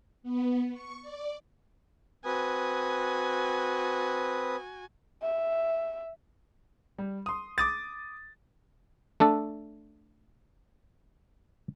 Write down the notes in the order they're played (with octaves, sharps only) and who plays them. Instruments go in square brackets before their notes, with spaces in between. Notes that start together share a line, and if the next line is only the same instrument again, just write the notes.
[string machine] B3
C#6
D5
[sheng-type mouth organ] C4 B4 D#6 [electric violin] F#4 G#5
[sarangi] E5
[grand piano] G3
C6 D#6
D6 D#6 A6
[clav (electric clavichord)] A3 D4 A4